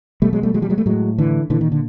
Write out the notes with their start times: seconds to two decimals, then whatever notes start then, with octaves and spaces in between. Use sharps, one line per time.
0.22 B2 G3 A3
0.33 F#3 G#3
0.43 G3 A3
0.54 F#3 G#3
0.62 F3 G3
0.70 F#3 G#3
0.78 G3 A3
0.86 A2 F#3 G#3
1.18 D3 E3
1.50 A#2 D3 E3
1.61 D#3
1.72 D3